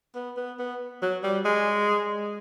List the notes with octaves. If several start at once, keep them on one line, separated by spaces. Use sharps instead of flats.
B3
B3
B3
F#3
G3
G#3